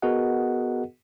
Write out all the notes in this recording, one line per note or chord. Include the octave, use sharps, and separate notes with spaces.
B3 F#4 G#4 A#4 D#5 F#5